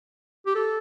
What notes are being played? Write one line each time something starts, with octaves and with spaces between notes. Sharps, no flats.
G4
A4